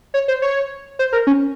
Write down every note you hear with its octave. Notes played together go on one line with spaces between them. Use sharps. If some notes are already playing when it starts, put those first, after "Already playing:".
C#5
C5
C#5
C5
A#4
C#4